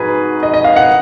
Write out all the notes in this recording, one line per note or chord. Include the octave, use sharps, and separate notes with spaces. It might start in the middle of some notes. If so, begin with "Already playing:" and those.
Already playing: G#2 F#4 G#4 B4
D#5
D#5
F5
F#5